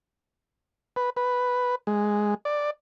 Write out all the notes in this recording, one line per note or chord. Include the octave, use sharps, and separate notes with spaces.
B4
B4
G#3
D5